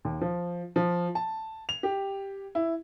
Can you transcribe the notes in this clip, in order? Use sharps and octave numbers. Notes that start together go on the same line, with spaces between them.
D#2
F3
F3
A5
F7
G4
E4